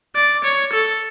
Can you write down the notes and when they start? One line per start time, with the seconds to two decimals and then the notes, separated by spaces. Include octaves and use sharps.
0.15 D5
0.45 C#5
0.73 A4